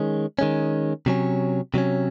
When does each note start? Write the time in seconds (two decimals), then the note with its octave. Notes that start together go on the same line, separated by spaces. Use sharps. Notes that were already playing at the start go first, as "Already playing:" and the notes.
Already playing: D#3 G#3 C#4
0.39 D#3 G#3 C#4
1.06 C3 F#3 C#4
1.74 C3 F#3 C#4